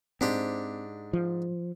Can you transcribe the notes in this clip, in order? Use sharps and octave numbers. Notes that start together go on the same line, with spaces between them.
G#2 C4 D4 G4
F3